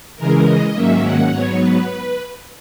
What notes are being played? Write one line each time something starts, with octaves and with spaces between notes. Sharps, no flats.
C#3 E3 G#3 A#4
D#5
G#2 D#3 F#3 A#3 C#4 E5
F#5
G#2 F#3 B3 C#5
B4